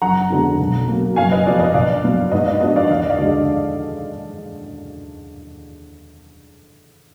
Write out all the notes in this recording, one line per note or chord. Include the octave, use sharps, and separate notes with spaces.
F#1 F#5 A#5
F2 D3 G#3 B3
B1
B2 A#3
F#1 F5 G#5
B4 D#5
F2 F3 B3 D5
B4 D#5
A#1 D5 F5
A#2 F#3 B3
G#2 B4 D#5
D5 F5
F3 B3 D4 B4 D#5
D5 F5
D#2 F5
D#5
D5 F5
D3 G#3 D4